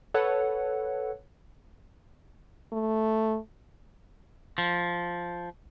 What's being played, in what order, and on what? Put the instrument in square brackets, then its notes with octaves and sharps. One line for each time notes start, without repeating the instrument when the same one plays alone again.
[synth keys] A4 B4 C#5 F#5
[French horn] A3
[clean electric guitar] F3